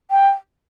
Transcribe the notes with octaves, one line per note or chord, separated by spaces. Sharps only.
G5